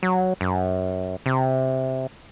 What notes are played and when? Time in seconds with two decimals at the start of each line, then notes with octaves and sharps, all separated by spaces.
0.03 F#3
0.41 F#2
1.26 C3